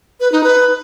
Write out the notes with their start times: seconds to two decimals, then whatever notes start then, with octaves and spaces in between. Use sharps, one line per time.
0.20 B4
0.32 D#4
0.44 B4